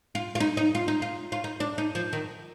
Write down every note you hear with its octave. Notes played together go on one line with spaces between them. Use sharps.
F4
F4
D#4
D#4
F4
D#4
F4
F4
D#4
D4
D#4
F3
D#3